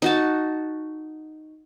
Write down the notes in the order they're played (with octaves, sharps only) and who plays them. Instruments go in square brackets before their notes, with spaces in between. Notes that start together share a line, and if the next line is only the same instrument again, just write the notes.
[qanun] D#4 F#4 A5